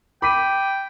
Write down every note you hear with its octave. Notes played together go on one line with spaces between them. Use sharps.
G5 B5 D6 B6 D#7